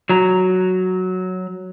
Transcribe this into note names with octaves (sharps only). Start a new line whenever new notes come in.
F#3 A#5